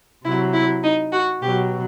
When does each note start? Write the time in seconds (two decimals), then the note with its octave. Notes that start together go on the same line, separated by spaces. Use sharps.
0.24 C3 F#3 E4
0.54 E4
0.83 D#4
1.13 F#4
1.41 B2 F#3 G4